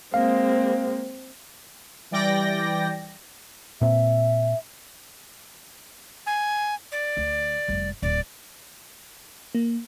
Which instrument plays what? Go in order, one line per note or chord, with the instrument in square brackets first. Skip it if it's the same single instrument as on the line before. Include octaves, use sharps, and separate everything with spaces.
[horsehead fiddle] G#3 A#3 [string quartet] C4 [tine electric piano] F5
[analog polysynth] E3 G3 D5 G5 A#6
[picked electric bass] A#2 C4 [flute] E5
[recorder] G#5
D5
[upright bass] D2 D3
F1 G3
[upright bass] D1 D3 [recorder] D5
[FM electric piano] A#3